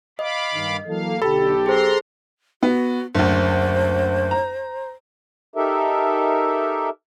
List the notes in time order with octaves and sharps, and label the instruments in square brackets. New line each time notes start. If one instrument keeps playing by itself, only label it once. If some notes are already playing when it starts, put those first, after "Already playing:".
[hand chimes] D#5 [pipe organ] F5 B5 D6
[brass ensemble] G2 D#3
[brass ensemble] E3 F#3 A4 [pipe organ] A#3 F5
[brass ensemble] B1 G4 [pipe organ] D3 [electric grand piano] A4 [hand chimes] B5
[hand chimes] G#4 C5 [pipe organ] A#5 C6
[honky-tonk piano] B3 [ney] F#4
[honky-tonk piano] F#1 D2 [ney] C5
[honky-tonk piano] A#5
[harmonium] D#4 G4 A4 A#4 E5